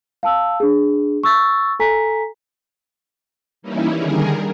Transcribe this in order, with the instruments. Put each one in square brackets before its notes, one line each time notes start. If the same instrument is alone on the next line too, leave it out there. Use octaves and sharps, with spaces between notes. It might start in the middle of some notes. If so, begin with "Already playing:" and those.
[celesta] F5 A5 E6
D4 G#4
C#6 E6 A6
A4 G#5 A#5 B6
[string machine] E3 G3 A#3 C#4 D#4 E4
D3 D#3 G3 G#4 A#4